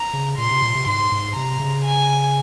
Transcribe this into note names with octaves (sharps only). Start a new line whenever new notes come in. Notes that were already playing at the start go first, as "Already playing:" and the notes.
Already playing: A#5
C#3
A#2 C6
C3
A#2
C3
G#2 C6
G#2
C3 A#5
C#3
G#5